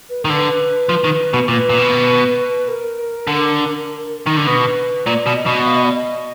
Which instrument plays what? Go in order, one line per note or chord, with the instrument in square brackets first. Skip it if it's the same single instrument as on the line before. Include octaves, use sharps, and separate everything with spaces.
[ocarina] B4
[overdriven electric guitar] D#3 [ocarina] A#4
[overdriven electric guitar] D3 [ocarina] B4
[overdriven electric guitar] F3
D#3
B2
[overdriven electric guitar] A#2 [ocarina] B4
[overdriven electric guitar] A#2
B2
[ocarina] A#4
[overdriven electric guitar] D3
D#3
D3
[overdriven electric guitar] B2 [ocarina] B4
[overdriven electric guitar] A#2 [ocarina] D5
[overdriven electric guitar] B2
[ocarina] D#5
[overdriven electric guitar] B2
[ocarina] F5
D#5
D5
D#5